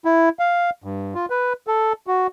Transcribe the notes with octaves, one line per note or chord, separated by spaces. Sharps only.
E4
F5
G2
F4
B4
A4
F#4